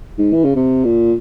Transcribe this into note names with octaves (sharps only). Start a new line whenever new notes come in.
G#2
E3
C#3
C3
A#2